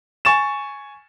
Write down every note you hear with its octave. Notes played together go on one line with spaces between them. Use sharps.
G#5 C#6 A6 E7